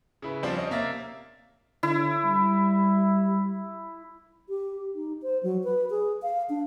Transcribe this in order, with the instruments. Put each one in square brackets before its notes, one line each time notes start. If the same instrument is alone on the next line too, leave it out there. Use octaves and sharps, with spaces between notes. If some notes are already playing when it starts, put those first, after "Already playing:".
[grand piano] C#3 E4 B4
F3 G3 C4 D4 F4
C#4 D4 C5 D#5
C3 A#3 E5 A6
[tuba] D3 [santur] E4
[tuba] G3
[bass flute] G4
D#4
C5
F#3
B4
G#4
F5
D4